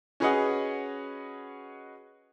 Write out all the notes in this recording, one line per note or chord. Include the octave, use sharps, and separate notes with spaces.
C#4 F#4 G#4 B4 D#5 F#5